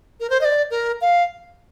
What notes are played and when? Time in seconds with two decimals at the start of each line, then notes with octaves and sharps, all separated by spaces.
0.20 A#4
0.30 C5
0.41 D#5
0.45 D5
0.71 A#4
1.01 F5